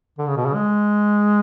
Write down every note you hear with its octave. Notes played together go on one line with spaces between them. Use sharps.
D3
C#3
B2
C#3
G#3